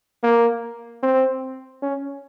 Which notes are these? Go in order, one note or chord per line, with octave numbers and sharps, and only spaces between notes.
A#3
C4
C#4